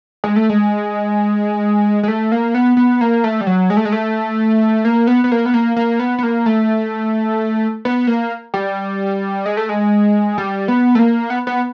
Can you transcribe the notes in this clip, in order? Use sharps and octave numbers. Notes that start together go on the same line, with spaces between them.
G#3
A3
G#3
G#3
A3
A#3
B3
B3
A#3
A3
G3
F#3
G#3
A3
G#3
A3
A#3
B3
B3
A#3
B3
A#3
A#3
B3
B3
A#3
A3
B3
A#3
G3
G#3
A3
G#3
G3
B3
A3
A#3
B3
B3